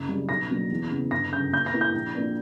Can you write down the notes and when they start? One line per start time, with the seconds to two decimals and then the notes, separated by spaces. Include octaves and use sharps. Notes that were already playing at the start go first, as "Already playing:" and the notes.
Already playing: F#1
0.08 F#2 C#3 G3
0.28 B1 A#6
0.50 B2 F#3 A#3 D4
0.71 E2
0.90 C#3 E3 B3
1.11 G1 A#6
1.32 F#2 C#3 G6
1.52 A#2 G6
1.66 A#6
1.74 A#3 E4
1.81 G6
1.94 A#1
2.15 A#2 A#3 D4